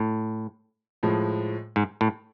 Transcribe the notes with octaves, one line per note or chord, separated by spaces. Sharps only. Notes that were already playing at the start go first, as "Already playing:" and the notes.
Already playing: A2
A2 F3 G#3
G#2
A2